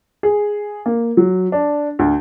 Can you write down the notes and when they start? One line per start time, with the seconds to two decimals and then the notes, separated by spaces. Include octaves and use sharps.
0.23 G#4
0.86 A#3
1.17 F#3
1.52 D4
1.99 D2